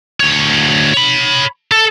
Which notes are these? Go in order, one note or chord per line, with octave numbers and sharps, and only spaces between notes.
D2 C#5
C#5 B5
A4